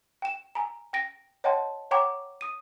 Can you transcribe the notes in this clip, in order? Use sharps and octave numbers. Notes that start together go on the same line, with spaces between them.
G5 E7
G#5 A#5
G5 A#6 D7
C#5 D#5 F#5 G5 A5 C6
C#5 F#5 G5 A#5 C#6 D6
D#6 D#7